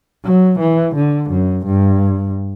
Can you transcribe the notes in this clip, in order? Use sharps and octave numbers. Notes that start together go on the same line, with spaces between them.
F#3
E3
D3
F#2
G2